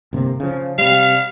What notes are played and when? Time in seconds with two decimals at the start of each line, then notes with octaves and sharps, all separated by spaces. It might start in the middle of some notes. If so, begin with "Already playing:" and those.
0.13 G1 C3 A#3
0.40 C#3 F3
0.78 C3 G3 F5